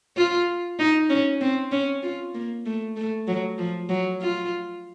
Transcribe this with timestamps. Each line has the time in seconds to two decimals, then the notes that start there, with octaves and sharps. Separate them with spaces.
0.17 F4
0.79 D#4
1.10 C#4
1.41 C4
1.72 C#4
2.03 F4
2.34 A#3
2.66 A3
2.96 A3
3.28 F#3
3.58 F3
3.89 F#3
4.21 F4